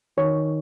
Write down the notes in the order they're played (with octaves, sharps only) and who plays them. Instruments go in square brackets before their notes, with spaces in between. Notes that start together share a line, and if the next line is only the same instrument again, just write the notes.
[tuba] D#3 [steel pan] C#5